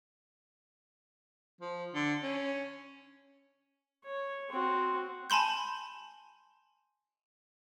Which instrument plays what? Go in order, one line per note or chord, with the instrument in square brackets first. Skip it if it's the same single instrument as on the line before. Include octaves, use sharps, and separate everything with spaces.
[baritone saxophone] F3
D3
C#4
[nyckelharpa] C#5
C4 F#4
[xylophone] G#5 A5 B5 C6 G6